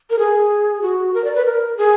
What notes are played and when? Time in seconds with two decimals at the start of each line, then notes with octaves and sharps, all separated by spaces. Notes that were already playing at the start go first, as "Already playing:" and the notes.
0.10 A#4
0.19 G#4
0.82 F#4
1.14 A#4
1.24 D5
1.35 B4
1.45 A#4
1.77 G#4